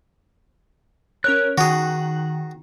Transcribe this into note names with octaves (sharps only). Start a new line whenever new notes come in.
C#4 A#4 C#5 F#6
D#3 F#4 G#4